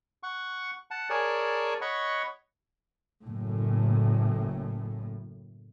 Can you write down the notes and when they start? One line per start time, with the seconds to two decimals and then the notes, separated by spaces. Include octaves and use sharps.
0.23 F#5 C#6
0.91 F#5 A5
1.10 G#4 A#4 C#5 D5 G#5 A5
1.81 C#5 D#5 F#5 B5 C#6
3.23 F#1 A2